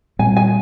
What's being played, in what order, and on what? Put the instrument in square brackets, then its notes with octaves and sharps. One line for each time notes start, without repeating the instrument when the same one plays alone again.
[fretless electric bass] A#2 G3 C4 [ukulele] G#5
[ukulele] G#5